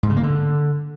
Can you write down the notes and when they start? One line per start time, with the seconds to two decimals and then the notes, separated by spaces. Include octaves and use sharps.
0.03 G#2
0.10 C#3
0.16 A#3
0.23 D3